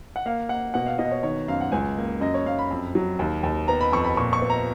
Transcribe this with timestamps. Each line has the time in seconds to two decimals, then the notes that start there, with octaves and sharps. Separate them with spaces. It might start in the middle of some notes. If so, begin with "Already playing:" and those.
0.16 F#5
0.26 A#3 F5
0.49 A#3 F#5
0.74 B2 F#5
0.86 F5
0.98 B2 D#5
1.11 C#5
1.23 D#3 C#5
1.48 F#2 F5
1.61 F#5
1.72 C#2 G#5
1.97 A#3
2.21 F#2 D#5
2.34 C#5
2.45 F#2 F5
2.59 B5
2.71 F2
2.95 F#3
3.19 D#2
3.43 D#2
3.68 B3 A#5
3.81 B5
3.92 F2 C#6
4.04 B5
4.17 A#2 C#6
4.33 C#6
4.42 B3
4.50 A#5